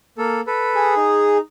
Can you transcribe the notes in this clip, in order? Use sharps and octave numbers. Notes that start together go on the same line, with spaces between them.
A#3 A4
A4 B4
G#4
D#4